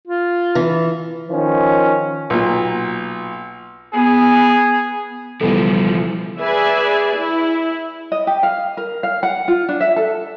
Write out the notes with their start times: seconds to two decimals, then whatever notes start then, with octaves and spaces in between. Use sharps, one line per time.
0.07 F4
0.55 E3
1.30 D#3 F3 C#4
2.30 B1 A#2
3.93 B3 G#4
5.41 C#2 B2 E3 F3 G3 A4
6.41 G#4 B4 D5 E5 G#5
7.16 E4
8.12 D#5
8.27 G4
8.43 F5
8.77 A#4
9.03 F5
9.23 F#5
9.48 F4
9.69 D4
9.81 E5
9.96 A4